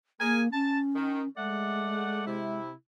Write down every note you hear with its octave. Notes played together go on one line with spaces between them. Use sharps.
A#3 G#4 A#4 G#5
C#4 A5
D#3
G#3 A3 D5 F#5
C3 E4